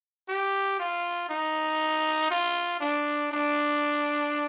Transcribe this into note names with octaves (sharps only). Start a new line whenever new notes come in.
G4
F4
D#4
F4
D4
D4